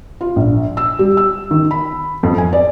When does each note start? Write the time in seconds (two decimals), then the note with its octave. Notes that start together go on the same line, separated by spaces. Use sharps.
0.21 F4
0.36 A#1
0.77 E6
0.99 G3
1.17 E6
1.51 D#3
1.71 B5
2.23 F2
2.38 G#5
2.53 D5